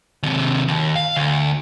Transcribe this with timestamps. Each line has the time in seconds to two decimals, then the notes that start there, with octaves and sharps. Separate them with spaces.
0.23 D#2 C3
0.68 D#2
0.96 F5
1.17 D2